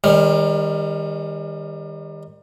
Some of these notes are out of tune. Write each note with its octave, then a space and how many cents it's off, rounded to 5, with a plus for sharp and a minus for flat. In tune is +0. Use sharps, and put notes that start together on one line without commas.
D#3 +5 G3 +35 C#4 +0